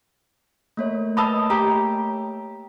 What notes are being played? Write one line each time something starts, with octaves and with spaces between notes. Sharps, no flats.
A3 A#3 C#5
B4 D#5 A5 B5 D#6 E6
G4 A#5